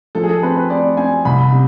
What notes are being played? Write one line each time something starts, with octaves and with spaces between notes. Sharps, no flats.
F3 A4
G#4
A4
C4 B4
B4
C4 D5
C4 G#5
C2 B5
C3